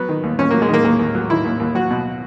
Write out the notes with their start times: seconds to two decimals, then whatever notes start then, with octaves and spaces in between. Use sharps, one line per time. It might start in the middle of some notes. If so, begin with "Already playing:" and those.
Already playing: F#3 B3
0.09 D#3
0.23 D#2
0.38 D#2 C#4
0.51 A#3
0.54 F#3
0.62 G#3
0.69 D#3 A#3
0.84 D#2 A#3
0.99 D#2
1.15 F#3
1.29 D#3 E4
1.45 D#2
1.60 D#2
1.75 F#3 F#4
1.90 B2